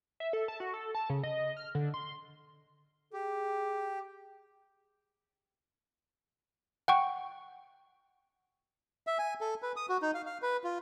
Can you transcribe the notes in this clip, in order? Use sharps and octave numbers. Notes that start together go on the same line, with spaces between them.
E5
A4
A5
F#4
A4
A5
C#3
D#5
F6
D3
C6
G4 G#4
F#5 G5 C#6
E5
G#5
A4
B4
D#6
F#4
D#4
F5
F5
B4
F4